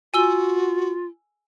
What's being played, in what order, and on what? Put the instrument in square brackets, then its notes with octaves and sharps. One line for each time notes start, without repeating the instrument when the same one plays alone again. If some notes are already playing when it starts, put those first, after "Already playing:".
[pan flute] F4 [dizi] F#4 [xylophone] G#5 E6 G7